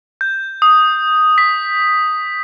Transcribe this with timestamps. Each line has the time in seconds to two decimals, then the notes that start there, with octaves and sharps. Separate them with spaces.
0.21 G6
0.62 D#6
1.38 B6